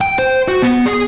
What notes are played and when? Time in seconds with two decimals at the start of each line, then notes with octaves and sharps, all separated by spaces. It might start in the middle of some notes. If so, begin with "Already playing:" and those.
0.01 G5
0.19 C5
0.48 F#4
0.62 B3
0.86 G#4